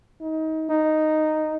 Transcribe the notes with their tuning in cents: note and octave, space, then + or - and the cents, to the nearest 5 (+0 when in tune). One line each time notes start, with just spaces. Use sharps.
D#4 +25
D#4 -5